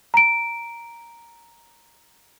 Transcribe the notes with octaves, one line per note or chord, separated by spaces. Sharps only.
A#5 D7